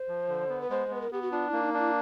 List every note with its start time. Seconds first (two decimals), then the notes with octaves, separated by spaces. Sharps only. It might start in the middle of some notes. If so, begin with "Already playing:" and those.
Already playing: C5
0.08 F3
0.29 D3
0.49 B3
0.61 B4
0.70 G#3 C5
0.91 B3 B4
1.01 A#4
1.12 B3 G4
1.22 F#4
1.32 D4 F4
1.48 A#3 E4
1.63 D#4
1.74 D4 E4